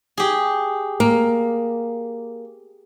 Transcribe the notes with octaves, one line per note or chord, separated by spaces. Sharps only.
G4 G#4
A#3